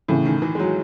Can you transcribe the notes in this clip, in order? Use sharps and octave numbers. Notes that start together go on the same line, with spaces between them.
A2 C#3 E3 A3 C#4
D#3
E3
G#3
F#3